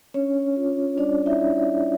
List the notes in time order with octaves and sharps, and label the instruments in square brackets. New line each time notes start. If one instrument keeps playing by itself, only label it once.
[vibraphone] C#4 D4 C#5
F4
G3 D4 D5
E4 E5